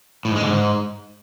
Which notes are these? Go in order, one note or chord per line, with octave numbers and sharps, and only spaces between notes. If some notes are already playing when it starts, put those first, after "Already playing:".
A2
G#2
G#3
D3
G#2